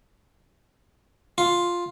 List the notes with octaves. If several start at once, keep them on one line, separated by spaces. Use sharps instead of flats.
F4